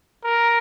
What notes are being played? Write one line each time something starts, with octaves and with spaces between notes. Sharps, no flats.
A#4